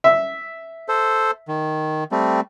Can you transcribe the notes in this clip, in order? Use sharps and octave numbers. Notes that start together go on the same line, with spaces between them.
E5
A4 C5
D#3
G3 A3 C4